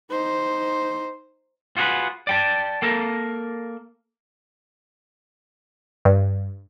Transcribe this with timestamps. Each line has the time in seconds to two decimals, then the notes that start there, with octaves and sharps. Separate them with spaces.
0.10 D#4 C5
1.77 F4 F#4 G#4 A#4 B4
2.27 D5 G5 A5
2.82 A#3 A4 A#4
6.05 G2